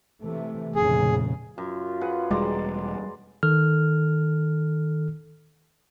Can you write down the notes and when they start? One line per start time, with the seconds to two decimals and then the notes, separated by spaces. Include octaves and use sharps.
0.23 C3 E3 A3
0.75 F1 A#2 C#3 G#4
1.58 F#2 F4
2.01 G#4 B4 F#5
2.31 E1 G3 G#3 D5 A#5 C6
3.43 D#3 A4 F6